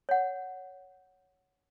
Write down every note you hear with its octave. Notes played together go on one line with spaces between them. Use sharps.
C#5 F#5